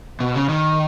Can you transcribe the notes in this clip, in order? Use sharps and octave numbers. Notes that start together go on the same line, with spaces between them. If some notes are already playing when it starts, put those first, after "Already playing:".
B2
C#3
D#3